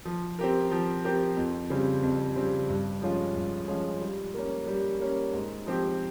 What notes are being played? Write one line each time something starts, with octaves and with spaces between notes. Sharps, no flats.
F3
C4 G4 A#4
F3
C4 G4 A#4
F2
C#3 G3 C4
F2
C#3 G3 C4
G2
F3 G#3 C#4 F4
G2
F3 G#3 C#4 F4
G3
A#3 C#4
G3
A#3 C#4
G#2
F3 C4 G4